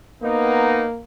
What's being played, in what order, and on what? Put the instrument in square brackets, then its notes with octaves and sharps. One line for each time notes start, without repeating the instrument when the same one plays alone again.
[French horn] A#3 [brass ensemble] B3 D#4